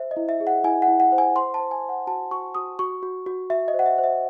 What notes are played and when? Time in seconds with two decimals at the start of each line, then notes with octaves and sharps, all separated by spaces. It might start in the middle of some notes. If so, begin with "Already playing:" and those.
Already playing: C5 E5
0.11 D#5
0.17 E4
0.29 E5
0.40 G#4
0.47 F#5
0.64 E4 G#5
0.82 F#5
0.88 E4
1.00 F#5
1.12 C5
1.18 G#5
1.36 C5 C6
1.54 A5
1.60 C5
1.71 G#5
1.84 C5
1.89 F#5
2.07 F#4 A5
2.31 F#4 C#6
2.55 F#4 D#6
2.79 F#4 C#6
3.03 F#4
3.26 F#4
3.50 F#4 E5
3.68 D#5
3.74 C5
3.79 F#5
3.86 E5
3.98 C5
4.04 E5